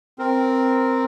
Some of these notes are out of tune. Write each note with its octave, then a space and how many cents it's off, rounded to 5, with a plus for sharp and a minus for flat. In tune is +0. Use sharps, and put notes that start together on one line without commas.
C4 +0 A#4 +0